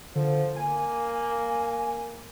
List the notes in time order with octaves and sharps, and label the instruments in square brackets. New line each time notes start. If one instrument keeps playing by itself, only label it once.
[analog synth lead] D3 [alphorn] F3
[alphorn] A#3 [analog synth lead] G#5